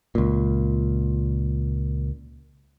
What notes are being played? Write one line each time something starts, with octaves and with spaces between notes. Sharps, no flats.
C#2 A#2